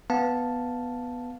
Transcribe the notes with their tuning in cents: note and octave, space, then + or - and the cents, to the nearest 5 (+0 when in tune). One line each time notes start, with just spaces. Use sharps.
B3 +0 F5 +0 A5 +0